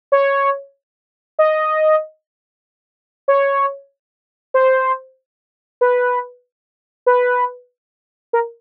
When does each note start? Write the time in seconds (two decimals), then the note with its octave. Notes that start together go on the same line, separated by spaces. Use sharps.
0.12 C#5
1.39 D#5
3.28 C#5
4.54 C5
5.81 B4
7.06 B4
8.33 A#4